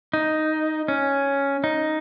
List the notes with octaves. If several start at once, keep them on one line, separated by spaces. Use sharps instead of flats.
D#4
C#4
D#4